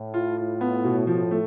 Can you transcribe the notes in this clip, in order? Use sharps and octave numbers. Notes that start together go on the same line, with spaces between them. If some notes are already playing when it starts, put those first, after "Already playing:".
Already playing: A2
F4
F4
B3
B2
A2 F3
A3